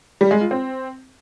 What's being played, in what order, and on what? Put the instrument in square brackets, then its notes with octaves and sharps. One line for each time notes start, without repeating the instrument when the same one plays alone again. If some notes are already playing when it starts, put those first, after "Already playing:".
[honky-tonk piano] G3
G#3
F4
C4